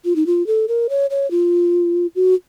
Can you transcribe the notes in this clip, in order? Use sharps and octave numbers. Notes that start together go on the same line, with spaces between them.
F4
D#4
F4
A4
A#4
C#5
C#5
F4
F#4